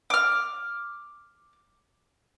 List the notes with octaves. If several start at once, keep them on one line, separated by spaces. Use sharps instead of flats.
D6 F6